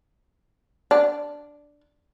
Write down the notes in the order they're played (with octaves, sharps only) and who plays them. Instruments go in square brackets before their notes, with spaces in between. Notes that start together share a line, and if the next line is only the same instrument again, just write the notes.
[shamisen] D4